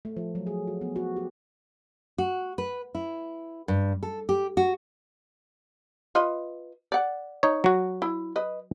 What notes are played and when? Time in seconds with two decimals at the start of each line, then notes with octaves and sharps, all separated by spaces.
0.05 A3
0.17 F3
0.35 F#3
0.47 G#4
0.67 F#4
0.81 B3
0.96 F#4
1.16 G4
2.18 F#4
2.58 B4
2.95 E4
3.68 G2
4.03 A4
4.29 G4
4.57 F#4
6.15 F4 B4 D#5
6.92 D5 F#5
7.43 D#4 C#5
7.64 F#3 F#4
8.02 E4
8.36 B4 D#5